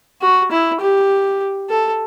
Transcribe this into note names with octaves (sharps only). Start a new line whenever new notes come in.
F#4
E4
G4
A4